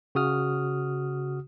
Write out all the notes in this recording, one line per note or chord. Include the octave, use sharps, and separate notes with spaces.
C#3 F#4 D#6 F6